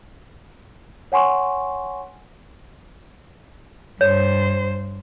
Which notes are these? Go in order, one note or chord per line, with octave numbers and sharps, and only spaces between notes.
C#5 F#5 G#5 C6 C#6
G2 C5 C#5